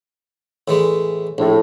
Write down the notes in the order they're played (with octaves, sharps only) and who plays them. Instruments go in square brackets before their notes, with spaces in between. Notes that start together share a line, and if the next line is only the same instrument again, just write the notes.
[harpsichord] A2 E3 G#3
[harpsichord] A#1 [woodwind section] A2